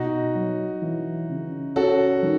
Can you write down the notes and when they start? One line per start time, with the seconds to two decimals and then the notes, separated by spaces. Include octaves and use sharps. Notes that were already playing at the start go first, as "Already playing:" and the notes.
Already playing: B2 D#4 F#4
0.35 F#3
0.82 E3
1.29 C#3
1.76 C#4 F#4 A4
2.23 D#3